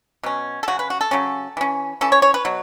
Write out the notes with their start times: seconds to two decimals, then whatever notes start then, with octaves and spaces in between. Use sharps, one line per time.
0.23 B2 F#3 C#4
0.63 A4
0.68 C#3 F#3 C#4 F#4
0.79 B4
0.90 F#4
1.01 A4
1.11 C#3 F#3 C#4
1.57 E3 C#4
2.01 E3 C#4 A4
2.12 C#5
2.22 C#5
2.34 B4
2.45 B2 F#3